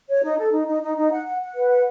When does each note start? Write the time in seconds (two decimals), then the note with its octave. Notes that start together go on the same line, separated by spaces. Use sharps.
0.08 C#5
0.23 D#4
0.38 A4
0.52 D#4
0.67 D#4
0.82 D#4
0.97 D#4
1.11 F#5
1.26 F#5
1.40 F#5
1.55 B4
1.70 F#5